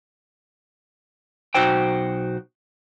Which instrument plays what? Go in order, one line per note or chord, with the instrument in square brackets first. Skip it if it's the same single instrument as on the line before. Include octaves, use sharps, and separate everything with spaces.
[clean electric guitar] B1 B2 D#4 F#4 C5 G5